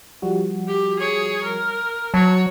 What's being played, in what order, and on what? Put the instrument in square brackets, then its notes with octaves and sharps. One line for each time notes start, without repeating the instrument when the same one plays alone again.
[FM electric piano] F3 G3 F#4
[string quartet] G4
G#4 C#5
A#4
[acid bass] F#3 [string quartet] F#4 C#5 [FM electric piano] A5